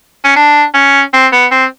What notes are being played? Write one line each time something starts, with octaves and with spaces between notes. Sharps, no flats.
C#4
D4
C#4
C4
B3
C4